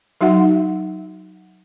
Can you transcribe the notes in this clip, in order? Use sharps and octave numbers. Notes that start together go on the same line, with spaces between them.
F#3 D#4 F#4 E5 F#5